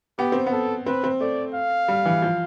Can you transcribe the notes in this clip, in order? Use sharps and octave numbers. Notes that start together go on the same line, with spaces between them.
B3 G4
C4
B3
A4
C4 B4
C4
A3 D5
F5
G3
E3
F3